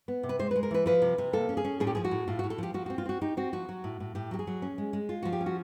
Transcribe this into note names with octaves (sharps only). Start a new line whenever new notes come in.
B3
C3
B4
G#3 C5
G#3 B4
A#4
E3 B4
F3 B4
C3
C3
A#3 A4
C#4
G#4
C#4
A2 G#4
G4
F3 G#4
F#4
A2
A2 F4
A2 F#4
A4
F3 G4
F3 F#4
C4 F#4
F4
C4 F#4
D#4 G4
C4 F#4
F3 F#4
F#3
A2
A2
A2 G4
F#3 G4
G#4
F#3
C#4
G#3
G#3
F4
F3 F#4
G4
C#4
F#4